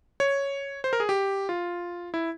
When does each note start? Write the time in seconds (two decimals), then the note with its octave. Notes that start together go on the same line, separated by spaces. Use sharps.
0.20 C#5
0.84 C5
0.93 A#4
1.00 G#4
1.09 G4
1.49 F4
2.14 E4